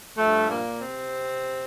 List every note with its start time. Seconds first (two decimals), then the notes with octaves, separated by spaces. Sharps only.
0.17 G2 F3 A3
0.48 A#2 A#3
0.81 C3 C4